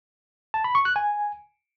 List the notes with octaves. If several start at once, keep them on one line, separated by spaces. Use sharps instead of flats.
A5
B5
C#6
F#6
G#5